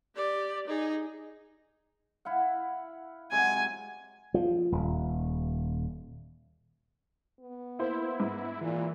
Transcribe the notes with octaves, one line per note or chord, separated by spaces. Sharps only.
G4 D5
D#4 G#4
E4 F5 F#5
C3 F#3 G#3 G#5
F3
D#1
B3
A#3 E4 C5
G#2
A#2 E3